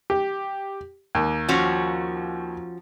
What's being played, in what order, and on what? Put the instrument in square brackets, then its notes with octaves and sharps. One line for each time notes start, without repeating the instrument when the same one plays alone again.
[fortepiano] G4
D#2
[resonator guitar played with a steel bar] F3 C#4 F#4